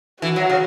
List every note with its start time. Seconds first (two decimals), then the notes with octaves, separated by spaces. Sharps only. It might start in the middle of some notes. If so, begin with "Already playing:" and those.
0.22 E3 F#4
0.36 F#3
0.50 C#3